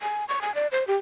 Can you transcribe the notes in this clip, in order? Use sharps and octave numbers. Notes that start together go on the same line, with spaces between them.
G#5
C#6
G#5
D5
C5
G4